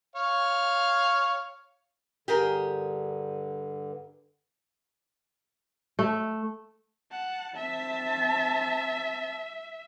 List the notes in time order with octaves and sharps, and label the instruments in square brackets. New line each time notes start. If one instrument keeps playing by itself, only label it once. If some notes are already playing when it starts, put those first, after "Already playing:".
[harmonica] C#5 F5
[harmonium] G2 D3 [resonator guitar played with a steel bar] G4 G#4 A#4
[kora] A3
[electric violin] F#5 A5
[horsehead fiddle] C4 A5 [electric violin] E5